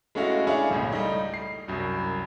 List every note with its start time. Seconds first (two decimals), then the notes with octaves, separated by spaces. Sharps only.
0.15 G#3 A3 C#4 E4 F#4 F5
0.47 D4 E4 G#4 C#5 E5 F5
0.71 G#1 C#2 A#2
0.92 G3 A3 D#4
1.34 C7
1.68 C2 F#2